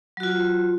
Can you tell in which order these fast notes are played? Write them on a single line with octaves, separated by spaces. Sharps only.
F#3 F#4 F4